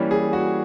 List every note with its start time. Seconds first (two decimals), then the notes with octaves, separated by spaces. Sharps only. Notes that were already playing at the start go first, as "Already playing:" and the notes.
Already playing: E3 G3 A#3 C#4
0.11 G#4
0.33 F#4